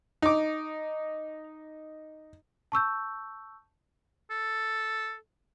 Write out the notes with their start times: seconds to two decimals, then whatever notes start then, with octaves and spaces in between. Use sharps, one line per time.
0.22 D#4 D6
2.72 A5 C#6 E6 G6
4.30 A4